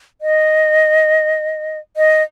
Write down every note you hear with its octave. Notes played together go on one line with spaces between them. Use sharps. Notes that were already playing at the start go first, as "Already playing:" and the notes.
D#5
D#5